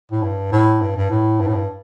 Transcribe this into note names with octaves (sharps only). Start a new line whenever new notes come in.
A2
G2
A2
G2
G2
A2
G2
A2
G2